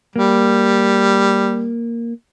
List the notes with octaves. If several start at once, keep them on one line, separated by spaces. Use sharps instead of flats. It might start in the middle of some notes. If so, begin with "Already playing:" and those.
G3 A#3